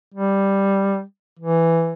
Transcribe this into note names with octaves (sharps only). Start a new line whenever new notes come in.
G3
E3